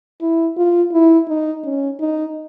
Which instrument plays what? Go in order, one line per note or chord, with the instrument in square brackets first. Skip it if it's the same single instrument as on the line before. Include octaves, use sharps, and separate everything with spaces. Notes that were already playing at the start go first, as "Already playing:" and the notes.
[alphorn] E4
F4
E4
D#4
C#4
D#4